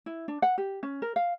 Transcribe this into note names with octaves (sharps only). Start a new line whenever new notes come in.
E4
D4
F#5
G4
C#4
A#4
F5